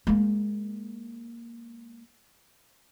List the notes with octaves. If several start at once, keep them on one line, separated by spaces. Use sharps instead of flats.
G#3 A#3